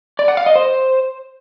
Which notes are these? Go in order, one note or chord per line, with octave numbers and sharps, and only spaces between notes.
D5
F#5
F5
D#5
C5